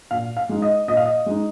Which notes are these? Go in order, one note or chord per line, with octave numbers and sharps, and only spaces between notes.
A#2 F5
F5
G#3 D#4
D#5
A#2 D#5
F5
D#5
G#3 D#4